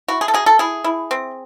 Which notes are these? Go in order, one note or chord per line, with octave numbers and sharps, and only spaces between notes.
E4 F#4
G#4
A4
F#3 G#4
A4
E4 G#4
E4
C4